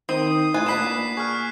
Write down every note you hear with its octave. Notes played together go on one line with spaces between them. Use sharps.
D#3 C4 D#6 C7
A2 F4 G#5 F#6
A#2 D4 B4 F#5 B6 C7 E7
G#4 C#6 F6